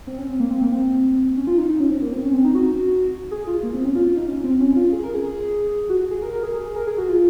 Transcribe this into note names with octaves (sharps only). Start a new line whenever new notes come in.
C4
C#4
C4
A#3
C4
A#3
C4
C#4
F4
D#4
D#4
C#4
C4
A#3
C4
C#4
C4
D#4
F#4
G#4
F4
A#3
C4
C#4
F4
F4
D#4
C#4
C4
C#4
F4
G#4
A#4
G#4
F#4
F#4
G#4
A#4
A#4
G#4
G#4
G#4
A#4
G#4
F#4
F4